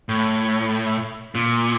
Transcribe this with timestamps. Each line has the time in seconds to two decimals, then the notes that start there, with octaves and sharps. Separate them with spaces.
0.09 A2
1.35 A#2